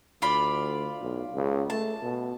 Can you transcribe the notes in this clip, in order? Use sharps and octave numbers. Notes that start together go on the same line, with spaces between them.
D2 F4 D5 B5
B1
C#2
A3 A5
B2